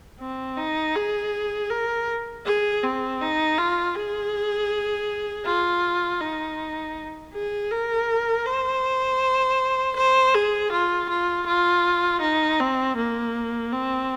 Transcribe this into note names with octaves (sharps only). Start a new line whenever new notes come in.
C4
D#4
G#4
A#4
G#4
C4
D#4
F4
G#4
F4
D#4
G#4
A#4
C5
C5
G#4
F4
F4
F4
D#4
C4
A#3
C4